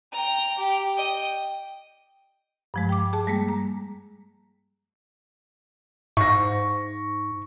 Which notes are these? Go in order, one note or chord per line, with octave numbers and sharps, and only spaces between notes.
G5 A#5
G4
D#5 G5
G2 F3 G#3
G5 D6
G#4 A5
G3 G#3 A#3
A#5
G#2 C#6 A#6